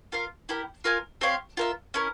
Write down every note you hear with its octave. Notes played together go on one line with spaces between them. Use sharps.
F4 A#4 F5
E4 G4 A#4
F4 A#4 F5 G#5
C4 G4 C#5 F5
F4 A#4 E5
C#4 E4 A#4